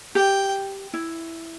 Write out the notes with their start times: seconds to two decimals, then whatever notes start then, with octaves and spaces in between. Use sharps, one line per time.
0.15 G4 G5
0.93 E4